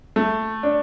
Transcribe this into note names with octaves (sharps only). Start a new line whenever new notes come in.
A3
D4